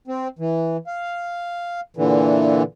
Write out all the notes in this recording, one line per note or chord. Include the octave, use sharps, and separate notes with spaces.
C4
E3
F5
A#2 D3 E3